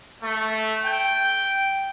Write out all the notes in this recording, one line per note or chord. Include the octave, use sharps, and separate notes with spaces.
A3
G5